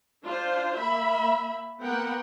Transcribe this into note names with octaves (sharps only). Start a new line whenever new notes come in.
D4 F4 C5
A#3 E5 B5
A#3 B3 A#4 F#5 G5